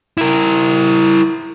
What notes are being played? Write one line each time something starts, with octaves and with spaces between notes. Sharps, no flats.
E4 A#4